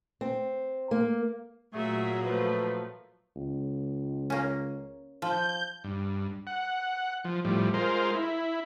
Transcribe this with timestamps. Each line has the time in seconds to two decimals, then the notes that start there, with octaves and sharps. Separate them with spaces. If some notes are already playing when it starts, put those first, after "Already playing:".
0.21 C4
0.91 A#3
1.73 A#2 F#3 A3 A#3 G#4 E5
2.25 F3 A3 B4
3.36 C#2
4.30 A#3 C#4
5.22 F3 G6
5.84 G2
6.47 F#5
7.25 F3
7.45 A2 F3 G3
7.74 G#3 F4 A#4 C5
8.15 E4